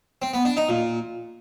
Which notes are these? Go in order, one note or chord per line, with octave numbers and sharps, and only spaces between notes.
C4
B3
D4
D#4
A#2